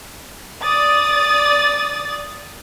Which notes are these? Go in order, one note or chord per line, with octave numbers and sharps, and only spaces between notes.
D5 D#6 A6